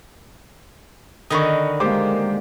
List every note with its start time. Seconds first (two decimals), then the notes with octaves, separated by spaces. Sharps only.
1.30 D3 D#3 A#4 D#5 B5 C#6 D#6
1.80 G#3 A#3 G4 C5 D5 D6